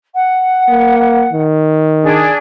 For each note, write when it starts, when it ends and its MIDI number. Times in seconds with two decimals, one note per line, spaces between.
0.14 1.41 78
0.69 1.27 58
1.33 2.31 51
2.03 2.37 62
2.03 2.37 68